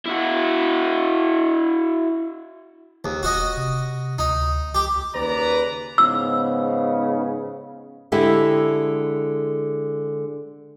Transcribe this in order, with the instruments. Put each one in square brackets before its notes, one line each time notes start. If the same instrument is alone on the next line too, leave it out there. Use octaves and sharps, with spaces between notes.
[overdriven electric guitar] E4 F#4
[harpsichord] D#2
[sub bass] E1 [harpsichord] F#4 D#5
[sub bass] C3
[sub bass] D2 [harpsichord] D#4
[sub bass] C#2 [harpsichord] G4
[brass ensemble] D#2 C#3 B4 D5 A#5
[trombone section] G#2 C#3 B3 [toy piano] E6
[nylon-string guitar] D3 G#3 E4 G4 A4